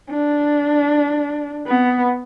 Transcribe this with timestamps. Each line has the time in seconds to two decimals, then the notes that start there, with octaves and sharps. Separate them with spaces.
0.10 D4
1.67 B3